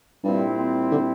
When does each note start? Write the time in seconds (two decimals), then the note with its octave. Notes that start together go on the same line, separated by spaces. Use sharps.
0.23 G2 A#2 G3 C4 E4
0.91 D3